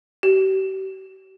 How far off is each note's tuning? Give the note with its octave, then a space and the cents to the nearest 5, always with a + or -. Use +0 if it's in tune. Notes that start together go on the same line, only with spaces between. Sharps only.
G4 -40